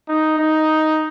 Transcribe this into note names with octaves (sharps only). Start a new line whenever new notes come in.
D#4
D#4